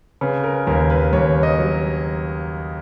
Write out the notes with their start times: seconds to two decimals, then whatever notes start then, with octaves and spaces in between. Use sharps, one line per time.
0.21 C#3 B4
0.44 A#4
0.67 D#2 A#4
0.90 B4
1.13 D#2 C#5
1.43 D#5
1.58 F#3